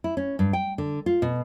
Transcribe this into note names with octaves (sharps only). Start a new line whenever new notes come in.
E4
C#4
G2
G5
D3
F4
B2